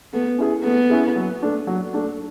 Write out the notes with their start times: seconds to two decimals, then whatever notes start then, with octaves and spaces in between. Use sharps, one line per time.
0.13 A3 B3
0.38 C#4 E4 G#4
0.64 A3 B3
0.90 C#4 E4 G#4
1.16 F#3
1.42 A3 D4
1.67 F#3
1.94 A3 D4